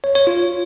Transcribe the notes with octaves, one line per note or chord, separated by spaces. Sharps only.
C#5
C#5
F4